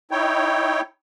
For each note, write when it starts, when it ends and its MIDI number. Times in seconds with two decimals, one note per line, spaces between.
0.11 0.81 63
0.11 0.81 64
0.11 0.81 73
0.11 0.81 79